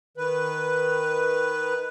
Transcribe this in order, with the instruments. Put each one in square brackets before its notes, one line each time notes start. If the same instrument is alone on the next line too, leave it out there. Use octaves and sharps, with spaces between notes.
[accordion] D#3 B4